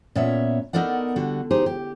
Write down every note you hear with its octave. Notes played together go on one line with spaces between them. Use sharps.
A#2 B3 C#4 C#5 E5
B3 D#4 A4 A#4 D5 F#5
D3 G3 F#4
D#4 G4 G#4 C5
G4